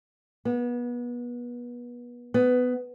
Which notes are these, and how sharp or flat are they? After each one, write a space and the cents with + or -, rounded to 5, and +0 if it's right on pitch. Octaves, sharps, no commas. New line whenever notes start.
B3 -30
B3 +15